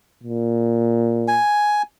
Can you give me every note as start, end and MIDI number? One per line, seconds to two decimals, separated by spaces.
0.23 1.40 46
1.28 1.82 80